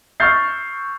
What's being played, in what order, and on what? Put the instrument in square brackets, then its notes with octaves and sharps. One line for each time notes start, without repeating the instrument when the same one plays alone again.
[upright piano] C#6 E6 F6 G6 A6 C7